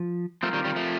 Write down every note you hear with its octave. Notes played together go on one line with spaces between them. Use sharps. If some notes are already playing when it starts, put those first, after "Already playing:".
Already playing: F3
F3 A3 C4 F4 A#4
D#3 G3
D#3 G3
F3 A3